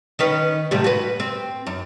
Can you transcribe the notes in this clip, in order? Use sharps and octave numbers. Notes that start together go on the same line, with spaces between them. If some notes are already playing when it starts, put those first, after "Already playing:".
D#3 C#4 B4
A2 C3 G3
F#4 B4
C4
F#2